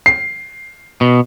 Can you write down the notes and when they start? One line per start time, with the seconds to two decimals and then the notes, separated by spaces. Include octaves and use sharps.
0.06 C7
1.01 B2